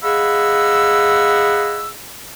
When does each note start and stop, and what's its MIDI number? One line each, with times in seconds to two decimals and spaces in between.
0.03 1.90 68
0.03 1.90 75
0.03 1.90 77
0.03 1.90 78
0.03 1.90 83
0.03 1.90 88